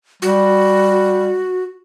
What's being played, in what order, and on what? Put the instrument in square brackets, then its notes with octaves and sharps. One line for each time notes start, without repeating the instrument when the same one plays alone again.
[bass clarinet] G3 [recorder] F#4